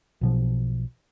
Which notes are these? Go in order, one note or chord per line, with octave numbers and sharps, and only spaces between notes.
B1 B2 F3